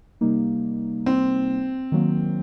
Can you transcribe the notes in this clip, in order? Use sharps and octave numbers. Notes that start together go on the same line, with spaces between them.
C3 G3 A#3 D#4
C4
D#3 F#3 A#3